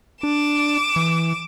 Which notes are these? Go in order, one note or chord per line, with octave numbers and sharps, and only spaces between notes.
D4 D6 E7
E3